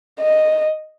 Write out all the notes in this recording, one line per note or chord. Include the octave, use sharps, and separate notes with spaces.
D#5